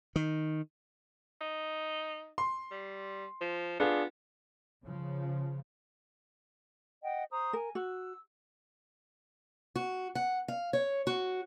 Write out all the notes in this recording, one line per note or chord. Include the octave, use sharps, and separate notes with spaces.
D#3
D#4
C6
G3
F3
B3 D4 F4 G#4
C#3 F3
D#5 F#5 G5
C5 A#5 D#6
A#4 G#5
F#4 E6
F#4
F#5
F5
C#5
F#4